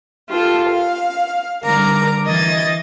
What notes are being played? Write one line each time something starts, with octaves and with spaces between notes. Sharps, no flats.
F4 G4 A4
F5
D3 G3 A#4 A#5 D6
E3 D#5 G#6 A6